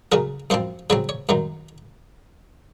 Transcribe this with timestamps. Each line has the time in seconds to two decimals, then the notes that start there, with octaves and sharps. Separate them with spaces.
0.12 C#3 F#3 C#4 A#4
0.50 F#2 F3 C4 C5
0.90 C#3 F#3 C4 C#5
1.09 C#5
1.29 F#2 D#3 F#3